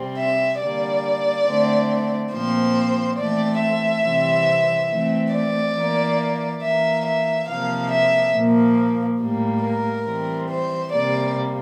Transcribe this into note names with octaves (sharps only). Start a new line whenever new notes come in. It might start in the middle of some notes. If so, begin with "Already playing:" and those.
Already playing: C3 G3 C4
E5
D3 G3 A#3 D5
D3 A3 C4
A#2 F3 C4 C5
E3 A3 C4 D5
E5
C3 E3 G3 C4
E3 A3 C4
D5
E3 A#3
E3 A#3 E5
E5
C3 F3 A#3 F5
E5
A#2 F3 A#3
A2 G3 A#3
A#4
E3 G3 C4
C5
C3 G3 A#3 D5